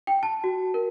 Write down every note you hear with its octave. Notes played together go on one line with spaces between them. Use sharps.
G5
A5
F#4
A#4